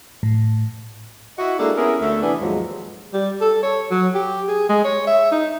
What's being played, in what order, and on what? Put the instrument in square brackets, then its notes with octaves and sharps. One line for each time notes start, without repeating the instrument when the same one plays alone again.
[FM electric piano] A2
[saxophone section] E4 F#4 D#5
G#3 A#3 D4 E4 G4 A4
B3 C#4 E4 G#4 A#4
D2 D3 A3 E5
C3 E3 B3 D4
D#2 G#2 F3 F#3 G#3
[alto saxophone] G3
A4
C#5
F#3
G4
G#4
G#3
C#5
E5
D#4